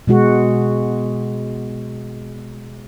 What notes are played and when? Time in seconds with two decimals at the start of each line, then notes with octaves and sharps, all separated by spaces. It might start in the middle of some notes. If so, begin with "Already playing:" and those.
0.07 B2 G#3 F#4